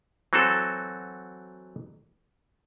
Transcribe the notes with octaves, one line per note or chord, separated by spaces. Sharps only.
E3 F#3 C4 F#4 A4